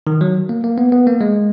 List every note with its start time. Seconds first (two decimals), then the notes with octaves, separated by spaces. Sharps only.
0.07 D#3
0.21 F#3
0.49 A#3
0.64 A#3
0.78 B3
0.92 B3
1.07 A#3
1.21 G#3